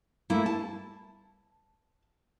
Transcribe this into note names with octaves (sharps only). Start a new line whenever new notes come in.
A3 A#3 E4
A5